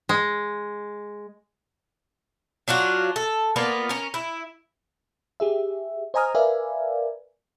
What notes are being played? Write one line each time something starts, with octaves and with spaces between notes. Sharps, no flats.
G#3
F#3 D4 F4 F#4
A4
A#3 B3 F4 D5
C#4 A#4
E4
G4 G#4 E5
C5 D#5 G#5 A#5 D#6 F6
A#4 B4 D5 E5 F5 G#5